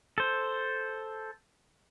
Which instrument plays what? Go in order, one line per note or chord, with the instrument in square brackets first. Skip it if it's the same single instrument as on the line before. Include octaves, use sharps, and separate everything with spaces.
[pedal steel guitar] A4 C5